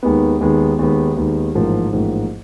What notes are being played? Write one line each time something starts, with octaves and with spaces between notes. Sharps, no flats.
D#2 D#3 G#3 B3
D#2 D#3 G#3 B3
D#2 D#3 G#3 B3
D#2 D#3 G#3 B3
A1 G#2 F3 A#3
A1 G#2 F3 A#3